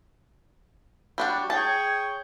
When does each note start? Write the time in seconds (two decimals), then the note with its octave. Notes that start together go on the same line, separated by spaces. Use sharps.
1.18 G3 D4 F#4
1.50 G#4 C#5 G5 A5